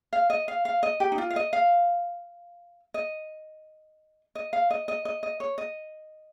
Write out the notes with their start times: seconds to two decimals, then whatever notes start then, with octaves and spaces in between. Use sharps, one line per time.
0.13 F5
0.30 D#5
0.48 F5
0.65 F5
0.83 D#5
1.00 G4
1.12 D#4
1.18 F4
1.30 F5
1.36 D#5
1.53 F5
2.94 D#5
4.35 D#5
4.53 F5
4.70 D#5
4.88 D#5
5.05 D#5
5.23 D#5
5.40 C#5
5.58 D#5